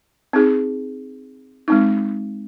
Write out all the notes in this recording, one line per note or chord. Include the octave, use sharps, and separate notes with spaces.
C4 D#4 G#4
G#3 C4 D#4